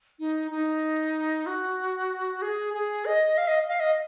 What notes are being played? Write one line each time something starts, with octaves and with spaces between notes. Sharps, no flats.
D#4
D#4
F#4
G#4
G#4
D#5
F5
D#5
F5
D#5